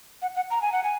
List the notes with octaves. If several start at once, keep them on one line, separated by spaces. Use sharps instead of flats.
F#5
F#5
A#5
G#5
F#5
G#5